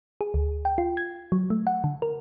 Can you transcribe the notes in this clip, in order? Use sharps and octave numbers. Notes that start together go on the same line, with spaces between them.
G#4
D2
G5
F4
G#6
F#3
A3
F#5
D3
A#4